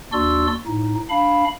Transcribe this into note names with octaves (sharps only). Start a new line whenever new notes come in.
D#2 D4 F#4 D5 C6 E6
A2 D#4
D4 F5 B5